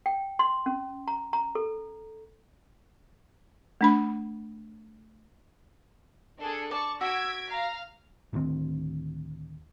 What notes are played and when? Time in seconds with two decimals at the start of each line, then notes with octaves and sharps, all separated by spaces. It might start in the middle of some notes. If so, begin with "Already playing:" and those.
0.06 G5
0.39 C6
0.66 C#4
1.08 A#5
1.33 A#5
1.55 A4
3.81 A3 D4 B5
6.40 D4 G#4 A4
6.71 D5 A5 C#6
7.01 F#4 E6 G#6 B6 D7
7.51 F5 A#5
8.33 D1 D2 D#3 C4